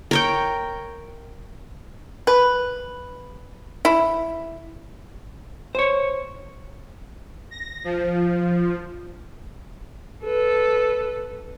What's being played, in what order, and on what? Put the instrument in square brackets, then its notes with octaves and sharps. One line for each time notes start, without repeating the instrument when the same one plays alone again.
[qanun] A#4 C#5 G5
[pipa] B4
E4
[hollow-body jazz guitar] C5 C#5
[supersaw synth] A#6
F3
[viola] A4 B4